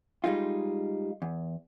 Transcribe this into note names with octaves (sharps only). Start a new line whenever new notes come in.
G3 G#3 D#4 F4
E2